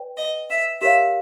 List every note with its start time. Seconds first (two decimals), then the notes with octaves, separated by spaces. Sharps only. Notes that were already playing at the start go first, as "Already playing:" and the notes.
Already playing: B4 D5 G5
0.17 D#5
0.49 E5
0.81 G4 A#4 C#5 E5 F5